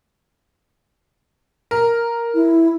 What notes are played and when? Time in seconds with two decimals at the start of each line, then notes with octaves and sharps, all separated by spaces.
1.71 A#4
2.34 E4